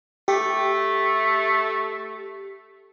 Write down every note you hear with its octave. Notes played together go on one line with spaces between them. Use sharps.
A3 G4